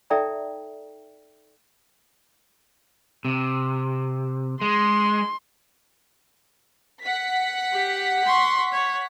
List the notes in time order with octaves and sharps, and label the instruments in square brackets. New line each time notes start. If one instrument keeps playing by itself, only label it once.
[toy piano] D#4 A4 D5 E5 G5 A#5
[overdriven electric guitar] C3
[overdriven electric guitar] G#3 [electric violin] C6
[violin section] F#5 B6
[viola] G4
C6 C#6
C#5